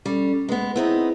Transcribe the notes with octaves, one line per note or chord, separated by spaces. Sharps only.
G3 C#4 A4
G#3 B3 B4
B3 C4 D#4 E4 G#4 E5